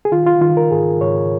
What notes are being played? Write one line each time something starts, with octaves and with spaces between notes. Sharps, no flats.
G#4
D#3 F4
F4
D#3 F4
A#4
G#2 G#4
G#2 C#5